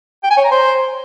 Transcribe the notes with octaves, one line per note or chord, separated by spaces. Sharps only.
G5
G#5
C#5
A#5
C5